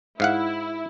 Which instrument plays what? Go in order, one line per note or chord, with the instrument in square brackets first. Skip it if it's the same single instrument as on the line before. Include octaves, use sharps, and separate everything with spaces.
[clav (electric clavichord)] G#2 F5 F#5 [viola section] E4